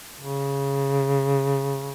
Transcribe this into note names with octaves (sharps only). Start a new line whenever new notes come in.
C#3